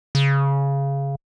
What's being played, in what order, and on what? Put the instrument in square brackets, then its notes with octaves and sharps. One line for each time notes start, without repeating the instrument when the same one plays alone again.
[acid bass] C#3